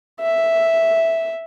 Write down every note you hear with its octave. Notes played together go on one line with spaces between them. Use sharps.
E5